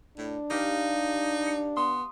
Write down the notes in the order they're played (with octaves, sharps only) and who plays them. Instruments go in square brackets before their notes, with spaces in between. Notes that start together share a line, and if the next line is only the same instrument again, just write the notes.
[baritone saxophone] A2 [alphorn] D4
[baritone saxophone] D#4 [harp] G4 F5
[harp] C#7
[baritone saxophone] B3 [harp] C6 D#6